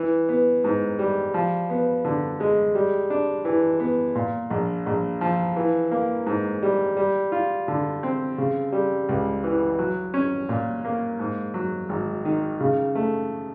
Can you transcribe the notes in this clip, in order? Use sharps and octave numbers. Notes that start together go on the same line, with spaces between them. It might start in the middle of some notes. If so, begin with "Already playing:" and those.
Already playing: E3
B3
G#2
G3
F3
B3
D3
G#3
G3
D4
E3
B3
A#2
A#1
A#1
F3
E3
A#3
G#2
G3
G3
F4
D3
C4
C#3
G3
C#2
E3
F#3
C#4
A#2
A#3
G#2
F#3
G#1
D#3
C#3
A3